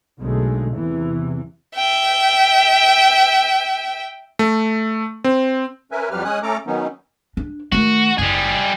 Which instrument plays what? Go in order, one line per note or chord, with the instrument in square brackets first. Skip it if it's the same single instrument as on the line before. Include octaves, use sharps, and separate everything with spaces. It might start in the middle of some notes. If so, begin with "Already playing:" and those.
[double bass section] B1 D3 G#3 A3
E2 C3 E3
[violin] E5 G5
[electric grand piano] A3
C4
[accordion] C#4 A#4 B4 E5 G#5
F2 F#3 G3 G4 B4 F6
G#3 C#4 G#5 D#6 F#6
A3 C#4 A4 A#5 D6
D#3 F#3 B3 C#4 D#4
[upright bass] D4
[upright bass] D#3 A3 [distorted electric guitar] F#4
[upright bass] F#1 [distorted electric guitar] G3 G#4